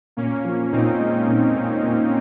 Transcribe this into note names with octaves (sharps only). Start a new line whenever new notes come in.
A#2 A#3 C#4
F3
A#2 C4 D#4
G#3
A#2
A#2
A#2